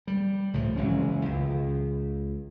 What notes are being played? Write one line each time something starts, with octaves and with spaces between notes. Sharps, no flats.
G3
C2 A2 F3
F#1 E3 G#3 C#4
C#2